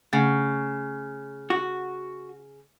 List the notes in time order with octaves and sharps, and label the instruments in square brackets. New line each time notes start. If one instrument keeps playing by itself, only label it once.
[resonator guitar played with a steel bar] C#3 [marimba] A3
[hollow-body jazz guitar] F#4